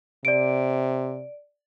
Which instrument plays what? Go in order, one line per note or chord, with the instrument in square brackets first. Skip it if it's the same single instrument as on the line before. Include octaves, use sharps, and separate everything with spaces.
[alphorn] C3 [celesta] D5 D7